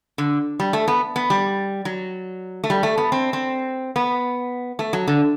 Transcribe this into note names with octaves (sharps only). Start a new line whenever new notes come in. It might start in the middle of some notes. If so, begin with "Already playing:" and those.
D3
G3
A3
B3
B3
G3
F#3
A3
G3
A3
B3
C4
C4
B3
A3
F#3
D3